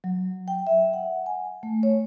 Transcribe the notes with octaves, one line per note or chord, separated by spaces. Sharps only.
F#3
G5
E5
F#5
G#5
A3
C#5